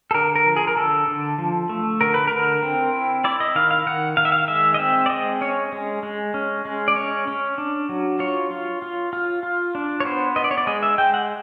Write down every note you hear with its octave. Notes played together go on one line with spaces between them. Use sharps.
A4
D3 A#4
A#4
F3
G#4
A#4
D3 A4
D3
F3
A3
D3 A#4
B4
D3 A#4
C4
E4
E4 D5
D#5
D#3 F5
F5
D#3 F#5
D#3 F5
E5
F5
G#3 E5
D#5
C4 E5
D5
G#3 D#5
C#4 C#5
G#3
G#3
C#4
G#3
D5
C#4 C#5
C#4
D4
F#3
F4 C#5
F4
F4
F4
F4
D4
C#5
B3 C5
B3 D#5
D5
C#5
D5
G#3 D#5
E5
G#3 G5
F#5